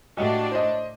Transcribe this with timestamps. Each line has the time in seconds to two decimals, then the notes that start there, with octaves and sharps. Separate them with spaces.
0.17 A2 D4 F#4 G4 D#5
0.51 C5 D#5